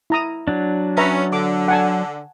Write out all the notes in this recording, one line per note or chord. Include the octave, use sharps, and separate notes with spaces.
E4 A#5 D#6
F#3 D4
C#4 B4 E5 A#5
D3 D6
F#5 G#5 A5